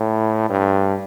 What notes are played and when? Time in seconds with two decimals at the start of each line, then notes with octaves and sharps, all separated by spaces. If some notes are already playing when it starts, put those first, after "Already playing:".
Already playing: A2
0.50 G2